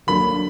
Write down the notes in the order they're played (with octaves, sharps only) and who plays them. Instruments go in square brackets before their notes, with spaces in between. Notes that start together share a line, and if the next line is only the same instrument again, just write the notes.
[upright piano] D3 F#3 A#3 D4 [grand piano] B5